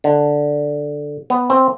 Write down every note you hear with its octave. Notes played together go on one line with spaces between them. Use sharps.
D3
B3
C4